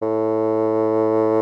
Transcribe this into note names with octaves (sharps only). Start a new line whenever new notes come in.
A2